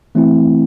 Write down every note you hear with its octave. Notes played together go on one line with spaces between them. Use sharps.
E3 A3 C4 E4